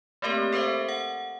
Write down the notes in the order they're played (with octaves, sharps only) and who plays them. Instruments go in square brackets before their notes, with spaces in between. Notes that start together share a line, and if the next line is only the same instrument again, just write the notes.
[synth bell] A3 A#3 C4 G4 A#4
A4 A#4 C5 E5 F5
F#5